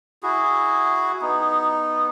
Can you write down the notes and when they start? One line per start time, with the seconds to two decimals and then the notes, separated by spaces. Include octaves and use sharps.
0.23 E4 F#4 G#4
1.22 B3 D#4